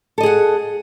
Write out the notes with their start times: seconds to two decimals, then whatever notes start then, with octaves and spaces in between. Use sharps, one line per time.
0.18 A4
0.20 D#5
0.23 G#4
0.26 F#5